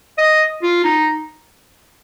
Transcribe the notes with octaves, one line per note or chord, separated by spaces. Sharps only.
D#5
F4
D#4